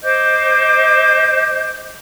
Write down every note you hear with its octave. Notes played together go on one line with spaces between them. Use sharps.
C5 D#5 D6 G6